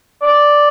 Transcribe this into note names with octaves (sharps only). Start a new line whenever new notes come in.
D5